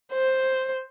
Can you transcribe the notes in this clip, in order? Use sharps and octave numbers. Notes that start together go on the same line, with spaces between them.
C5